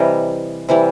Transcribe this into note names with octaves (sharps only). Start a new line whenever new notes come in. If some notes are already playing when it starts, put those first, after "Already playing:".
Already playing: C3 E3 G3 D#5
C3 E3 G3